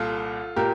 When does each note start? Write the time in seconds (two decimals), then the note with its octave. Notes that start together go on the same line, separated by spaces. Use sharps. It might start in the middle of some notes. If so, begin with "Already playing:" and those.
Already playing: C2 A#2 F4 A4
0.56 A#2 G4 A#4